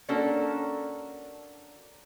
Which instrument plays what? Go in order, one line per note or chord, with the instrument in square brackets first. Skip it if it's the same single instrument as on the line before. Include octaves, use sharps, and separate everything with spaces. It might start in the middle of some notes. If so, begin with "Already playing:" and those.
[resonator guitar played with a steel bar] A#3 C#4 D4 F#4 A4 A#4